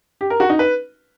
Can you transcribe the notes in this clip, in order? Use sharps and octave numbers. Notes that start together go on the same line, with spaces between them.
G4
A#4
F#4
D#4
B4